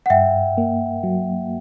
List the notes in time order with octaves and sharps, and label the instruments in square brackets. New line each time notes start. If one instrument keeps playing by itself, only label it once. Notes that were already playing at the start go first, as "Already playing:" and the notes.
[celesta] F#5
[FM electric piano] G2 [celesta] E5 G5
[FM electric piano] A#3
F#3